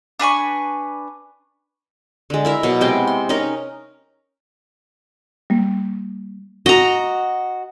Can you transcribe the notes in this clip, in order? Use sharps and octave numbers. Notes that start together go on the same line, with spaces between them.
D4 B4 G#5 C#6
D3 G#3
E4 A#4 E5
B2 F#3 A#4
C3 G#3 B3 G5
C6
C#4 D#4 A#4 D#5
G3 A#3
F#4 D#5 A#5